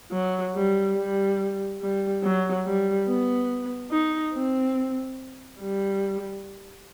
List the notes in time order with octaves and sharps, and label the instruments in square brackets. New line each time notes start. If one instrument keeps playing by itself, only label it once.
[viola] F#3
G3
G3
G3
F#3
G3
B3
D#4
C4
G3